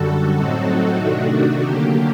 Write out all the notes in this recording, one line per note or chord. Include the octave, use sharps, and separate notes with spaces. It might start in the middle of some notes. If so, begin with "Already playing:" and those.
Already playing: F#2 D3 G3 F#4 A4
A2 F#3 C4 D#4
C3 D#3 A3 D4 F#4
D3 F#3 A#3 G4